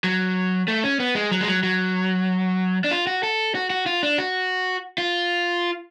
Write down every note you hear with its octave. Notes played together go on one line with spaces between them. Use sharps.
F#3
A3
C#4
B3
G#3
F#3
G#3
F#3
F#3
D4
F4
F#4
A4
F#4
F#4
F4
D4
F#4
F4